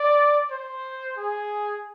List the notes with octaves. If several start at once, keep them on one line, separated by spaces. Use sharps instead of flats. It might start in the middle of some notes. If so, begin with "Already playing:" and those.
Already playing: D5
C5
G#4